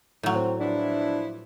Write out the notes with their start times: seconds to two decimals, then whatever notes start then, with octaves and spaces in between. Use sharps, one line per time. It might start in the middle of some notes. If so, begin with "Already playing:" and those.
0.23 A2 F#3
0.35 C4
0.60 E3 F3 D4 E4